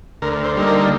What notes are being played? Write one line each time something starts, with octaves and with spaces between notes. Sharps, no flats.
D2 A#4
C5
D3 G3 A#3 D#4
A#4